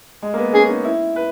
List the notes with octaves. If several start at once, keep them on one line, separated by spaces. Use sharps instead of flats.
G#3
A#3
B3
C#4 G#4
D#4
E4
B4